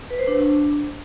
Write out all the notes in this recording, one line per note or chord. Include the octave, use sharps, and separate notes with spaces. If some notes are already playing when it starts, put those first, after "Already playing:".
B4
C5
D4